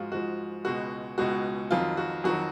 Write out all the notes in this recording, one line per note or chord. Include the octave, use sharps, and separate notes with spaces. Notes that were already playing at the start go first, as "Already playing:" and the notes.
Already playing: G#2 F3 G#3 F4 F#4
G#2 F3 G#3 F#4
C#2 B2 G#3 F#4
C#2 B2 G#3 F#4
F2 D#3 F#3 F4
F#4
F2 D#3 F#3 F#4